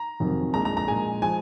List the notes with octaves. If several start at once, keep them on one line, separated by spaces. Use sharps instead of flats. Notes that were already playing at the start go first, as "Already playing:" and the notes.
Already playing: A#5
F1 F2 D#3 F#3
A#1 A#2 G#3 A#5
A#5
A#5
A#1 A#2 G#3 G#5
F3 G#3 G#5